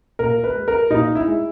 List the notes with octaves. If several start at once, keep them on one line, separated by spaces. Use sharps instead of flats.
A#2 A#4
B4
G#3
A#4
A#2 D#4
E4
G#3